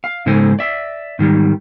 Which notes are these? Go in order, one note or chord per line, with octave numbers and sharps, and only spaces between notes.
F5
G#2 C#3 G#3 A3 C5 G#5
D5 E5
G#2 D#3 G3